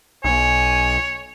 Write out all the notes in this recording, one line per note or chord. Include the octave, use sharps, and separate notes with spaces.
B1 C#5 G#5